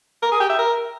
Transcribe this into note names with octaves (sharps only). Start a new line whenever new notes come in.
A#4
G#4
G4
E5
A#4